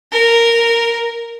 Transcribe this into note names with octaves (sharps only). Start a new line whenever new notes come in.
A#4